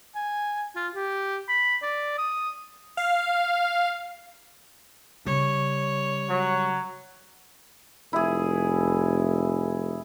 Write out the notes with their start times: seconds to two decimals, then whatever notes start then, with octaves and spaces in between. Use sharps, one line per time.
0.15 G#5
0.76 F4
0.95 G4
1.49 B5
1.82 D5
2.18 D#6
2.97 F5
5.26 C#3 G3 C#5
6.29 F#3
8.13 F1 E4 G#4